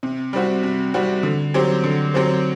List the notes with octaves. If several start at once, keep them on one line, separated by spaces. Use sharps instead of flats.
C3
G3 C4 F#4
C3
G3 C4 F#4
D3
F#3 C4 G4 C5
D3
F#3 C4 G4 C5